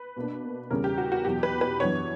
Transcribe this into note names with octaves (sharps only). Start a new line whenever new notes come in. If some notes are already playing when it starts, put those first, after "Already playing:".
Already playing: B4
B2 A#3 D4
E2 C#3 G3 C#4 A#4
G4
F#4
F#4
E2 B2 F#3 G4
B4
B4
F#2 E3 B3 D4 C#5